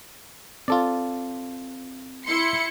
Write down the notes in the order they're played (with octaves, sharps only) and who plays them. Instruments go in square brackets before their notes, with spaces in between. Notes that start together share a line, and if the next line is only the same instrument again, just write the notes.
[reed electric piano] C4 [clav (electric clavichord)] F4 A4 D5
[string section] E4 C6 C#7